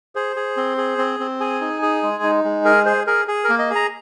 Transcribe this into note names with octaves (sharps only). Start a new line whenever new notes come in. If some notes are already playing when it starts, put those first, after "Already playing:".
G#4 C5
G#4
C4
G#4
C4
C4
G#4 G#5
D#4
G#4
G#3
D#4
G#3
G#4 A#4
G#4 C5
G#4 A#4
G#4
A#4
A#3
D#5
G#4
A#5